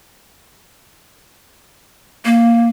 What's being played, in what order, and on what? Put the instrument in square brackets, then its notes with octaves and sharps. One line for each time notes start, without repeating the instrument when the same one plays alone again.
[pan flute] A#3